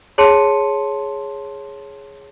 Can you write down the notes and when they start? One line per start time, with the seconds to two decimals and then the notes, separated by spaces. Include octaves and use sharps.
0.18 G#4 C#5 A5 C6 C#7 D#7